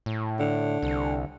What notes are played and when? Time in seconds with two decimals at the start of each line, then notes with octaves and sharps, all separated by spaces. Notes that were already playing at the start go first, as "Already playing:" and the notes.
0.06 A2
0.40 D3
0.82 C2